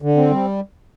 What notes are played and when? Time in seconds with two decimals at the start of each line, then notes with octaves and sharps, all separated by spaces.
0.02 D3
0.16 C4
0.31 G3